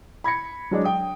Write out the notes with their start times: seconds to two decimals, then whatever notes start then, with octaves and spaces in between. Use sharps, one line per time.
0.24 B5 G#6 A#6 C#7
0.71 F#3 G#3 D4
0.84 G5 D#6